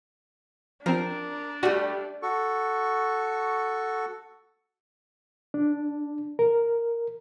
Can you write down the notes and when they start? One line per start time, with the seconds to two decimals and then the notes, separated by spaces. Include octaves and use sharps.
0.86 F3 C4 D4 A#4
1.63 G3 A3 F#4
2.22 F#4 A4 C#6
5.54 D4
6.39 A#4